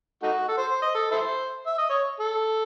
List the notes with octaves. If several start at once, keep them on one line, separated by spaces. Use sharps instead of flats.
A3 D#4 F#4
A4
C5
C5
D#5
A4
E4 A4 C5
E5
D#5
C#5
A4